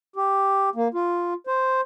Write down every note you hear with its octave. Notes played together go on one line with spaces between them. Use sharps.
G4
A#3
F4
C5